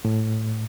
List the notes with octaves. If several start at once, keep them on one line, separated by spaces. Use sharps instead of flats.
A2